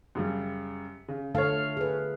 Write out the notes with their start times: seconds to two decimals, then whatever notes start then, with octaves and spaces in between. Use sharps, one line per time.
0.15 F#2 C#3 G3
1.08 C#3
1.35 D3 A3 A4 C#5 F5
1.77 G#4 B4